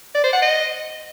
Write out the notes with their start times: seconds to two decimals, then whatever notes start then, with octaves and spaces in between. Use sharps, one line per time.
0.14 D5
0.24 C5
0.33 F#5
0.42 D#5